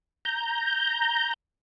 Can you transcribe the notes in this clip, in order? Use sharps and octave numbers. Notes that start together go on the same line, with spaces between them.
A#5 G6